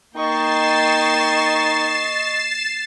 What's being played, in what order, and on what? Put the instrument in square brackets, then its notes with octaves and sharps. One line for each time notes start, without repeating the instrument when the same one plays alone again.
[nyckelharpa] A#3 G5 [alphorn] D#4 [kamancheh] D#5 C#6 [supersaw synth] A6 C7 E7